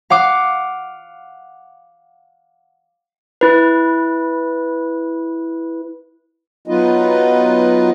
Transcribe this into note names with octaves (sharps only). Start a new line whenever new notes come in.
F5 F#5 D6
E4 B4
F#3 B3 D#4 F4 B4 D#5